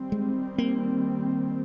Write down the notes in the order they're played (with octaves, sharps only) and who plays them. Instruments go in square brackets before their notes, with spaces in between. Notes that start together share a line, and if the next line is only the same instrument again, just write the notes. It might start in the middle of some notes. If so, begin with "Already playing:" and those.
Already playing: [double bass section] D#3 G3 C4
[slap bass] G#3
A#3